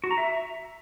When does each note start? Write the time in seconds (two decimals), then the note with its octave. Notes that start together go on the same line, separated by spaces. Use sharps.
0.04 F#4
0.11 A#5
0.18 E5